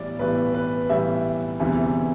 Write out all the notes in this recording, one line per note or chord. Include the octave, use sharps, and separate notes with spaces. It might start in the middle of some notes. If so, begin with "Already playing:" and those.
Already playing: B1 A2 E3 G3 D5
B1 A2 E3 G3 B4
B4
B1 A2 E3 G3 E5
E1 D2 C3 E3 G3